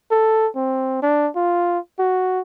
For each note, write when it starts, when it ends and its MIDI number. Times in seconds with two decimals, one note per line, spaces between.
0.12 0.48 69
0.56 1.01 60
1.03 1.29 62
1.36 1.79 65
1.99 2.40 66